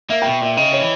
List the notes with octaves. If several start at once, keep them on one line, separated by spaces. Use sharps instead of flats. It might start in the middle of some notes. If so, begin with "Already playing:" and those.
A#3 E5
B2 G5
A#2 E5
C#3 D#5
C#5
E3